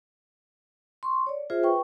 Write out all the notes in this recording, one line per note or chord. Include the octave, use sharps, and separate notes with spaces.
C6 C#6
C#5 D5
F4 G#4 C5 E5
B4 G5 C#6